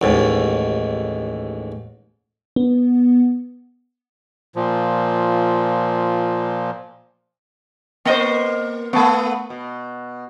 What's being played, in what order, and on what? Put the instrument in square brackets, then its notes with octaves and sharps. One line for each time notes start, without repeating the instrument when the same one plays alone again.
[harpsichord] A1 D#2 G#2
[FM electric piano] B3
[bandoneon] A#2 F3
[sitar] A#3 C5 [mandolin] D#5 G5 C#6
[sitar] A3 B3 [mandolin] A5 C#6
[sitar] B2